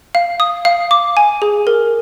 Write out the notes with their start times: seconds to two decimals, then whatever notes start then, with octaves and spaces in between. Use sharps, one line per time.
0.15 F5
0.40 D#6
0.65 F5
0.91 D6
1.17 G#5
1.42 G#4
1.67 A#4